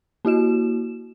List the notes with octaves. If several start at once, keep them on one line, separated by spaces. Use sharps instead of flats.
A#3 E4 F#4 E7